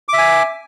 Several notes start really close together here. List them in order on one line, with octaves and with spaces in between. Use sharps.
D6 E5 G#5